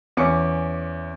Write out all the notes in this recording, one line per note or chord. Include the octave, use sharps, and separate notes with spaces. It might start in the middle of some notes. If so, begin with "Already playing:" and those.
E2 C#4 D6 C#7